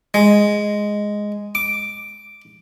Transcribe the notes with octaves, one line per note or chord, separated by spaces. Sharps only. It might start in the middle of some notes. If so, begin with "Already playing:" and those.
G#3
D6